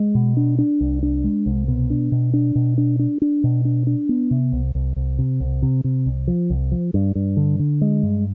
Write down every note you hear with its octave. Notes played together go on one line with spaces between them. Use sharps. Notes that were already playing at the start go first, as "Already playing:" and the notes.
Already playing: G#3
B2
D4
D4
C2
D4
G#3
C2
B2
D4
B2
D4
B2
D4
D4
D4
B2
D4
D4
B3
C3
C2
C2
C2
C3
C2
C3
C3
C2
F3
C2
F3
G2
G2
D3
D3
G#3
G2